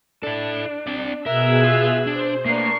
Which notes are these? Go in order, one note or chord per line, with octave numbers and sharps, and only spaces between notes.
D4 E4 A4
C4 D5
B2 G#4 A#4 E5 E6 F#6 G#6
F4
D4 C5
A3 A#3 D4 A#4 B4 C#6 C7